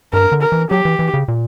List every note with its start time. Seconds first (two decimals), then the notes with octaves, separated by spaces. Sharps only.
0.13 G2 A#4
0.32 D3
0.42 A#4
0.52 E3
0.71 F#3 G4
0.85 E3
0.99 E3
1.14 C#3
1.28 A#2